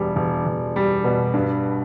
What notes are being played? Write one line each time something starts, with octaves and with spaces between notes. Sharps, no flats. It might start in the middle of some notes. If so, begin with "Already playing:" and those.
Already playing: E1 G3
E1
E1
G3
B2
G2